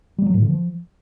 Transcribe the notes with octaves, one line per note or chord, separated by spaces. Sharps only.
G3
F#3
A2
D3
F3